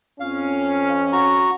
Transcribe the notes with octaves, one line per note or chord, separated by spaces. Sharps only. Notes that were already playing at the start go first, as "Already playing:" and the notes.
F2 C#4 F5
F#4 A#5 C#6